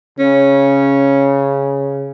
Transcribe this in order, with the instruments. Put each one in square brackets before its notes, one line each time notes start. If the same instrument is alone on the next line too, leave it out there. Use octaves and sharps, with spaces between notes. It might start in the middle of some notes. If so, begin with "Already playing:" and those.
[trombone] C#3 [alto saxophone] C#4